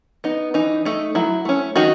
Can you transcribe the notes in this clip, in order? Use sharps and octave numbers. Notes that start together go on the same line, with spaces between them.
B3 D#4
E3 D#4
A3 D#4
F#3 E4
A3 C#4
D#3 D#4 F#4